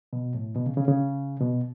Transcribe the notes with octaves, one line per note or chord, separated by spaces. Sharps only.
B2
A2
B2
C#3
C#3
C#3
B2